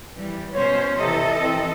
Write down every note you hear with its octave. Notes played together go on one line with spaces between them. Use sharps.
E3 G3
B2 C#4 C5 C#5
C3 E3 A4 D#5
C4